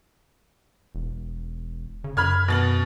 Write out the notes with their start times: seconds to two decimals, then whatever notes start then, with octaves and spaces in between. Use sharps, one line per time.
0.95 E1
2.04 C#3
2.17 F#2 B5 F6 G#6
2.48 B2 A6 F#7